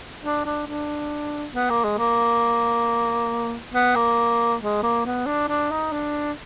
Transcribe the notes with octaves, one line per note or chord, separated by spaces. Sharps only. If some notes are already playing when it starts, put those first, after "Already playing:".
D4
D4
D4
B3
A#3
G#3
A#3
B3
A#3
G#3
A#3
B3
D4
D4
D#4
D4